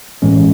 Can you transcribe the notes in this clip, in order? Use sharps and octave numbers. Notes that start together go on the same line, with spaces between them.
A2 E3 G#3 C#4